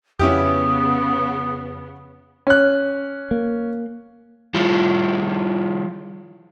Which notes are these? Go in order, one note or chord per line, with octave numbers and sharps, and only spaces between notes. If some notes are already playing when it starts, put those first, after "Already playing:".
F2 C#3 B3 C#4 E4 G4 D#6
C#4 F#6
A#3
F3 G3 E4 F4 G4